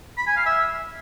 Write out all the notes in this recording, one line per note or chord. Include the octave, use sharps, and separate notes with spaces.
B5
G#5
F5
E5